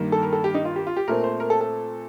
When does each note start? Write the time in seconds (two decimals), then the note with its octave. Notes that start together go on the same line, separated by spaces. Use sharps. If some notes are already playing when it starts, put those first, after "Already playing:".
Already playing: G2 D#3 A#3
0.12 A4
0.23 A#4
0.33 A4
0.44 G4
0.54 D#4
0.65 F4
0.76 G4
0.87 F4
0.96 G4
1.07 A#2 A3 C4 A#4
1.24 C5
1.40 A#4
1.50 A4
1.61 A4